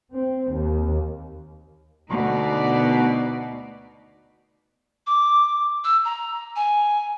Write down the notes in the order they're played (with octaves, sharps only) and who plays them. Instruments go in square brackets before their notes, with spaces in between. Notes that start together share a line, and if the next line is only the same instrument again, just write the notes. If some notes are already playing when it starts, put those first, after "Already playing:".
[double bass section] C4
D#2
[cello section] D2 B2 D#4 D5
[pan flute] D6
E6
A#5
G#5